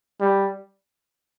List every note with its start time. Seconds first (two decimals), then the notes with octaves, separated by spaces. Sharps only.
0.20 G3